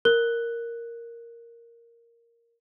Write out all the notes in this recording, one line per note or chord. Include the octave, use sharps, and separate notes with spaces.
A#4 F#6 G7